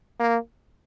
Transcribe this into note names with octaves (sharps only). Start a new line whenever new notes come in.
A#3